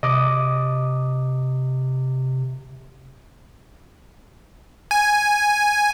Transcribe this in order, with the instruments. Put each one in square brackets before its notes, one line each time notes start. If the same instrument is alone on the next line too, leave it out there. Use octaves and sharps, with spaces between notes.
[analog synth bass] C3 [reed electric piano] D#5 D6 D#6
[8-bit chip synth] G#5